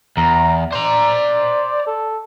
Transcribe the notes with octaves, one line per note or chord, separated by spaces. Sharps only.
E2 A#5
C5 D5 A#5
A4